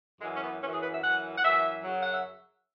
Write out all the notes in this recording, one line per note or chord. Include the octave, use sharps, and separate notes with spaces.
F#2 E3 G#3
C#4
B3
F#2 E3 C#4
G#4
B4
E5
F#2 E3 F#5
F#5
F#2 E3 E5
F#2 C#3 F#3
F#5
E5